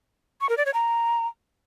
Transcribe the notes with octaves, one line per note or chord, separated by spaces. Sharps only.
C#6
A#4
D5
C#5
A#5